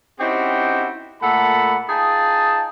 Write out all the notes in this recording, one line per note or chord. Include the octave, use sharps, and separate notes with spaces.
C4 C#4 D#4 E4 F#4 G4
A#2 A3 A4 F#5 A5 B5
D#4 F4 G#4 G5 A5